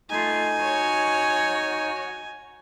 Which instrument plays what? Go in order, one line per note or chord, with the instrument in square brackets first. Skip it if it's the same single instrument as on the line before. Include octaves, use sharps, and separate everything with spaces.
[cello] A3 F4 [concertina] D#4 [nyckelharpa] G#5
[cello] F#4 C#5